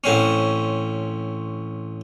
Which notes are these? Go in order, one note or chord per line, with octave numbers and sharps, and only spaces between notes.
A1 C4 C#4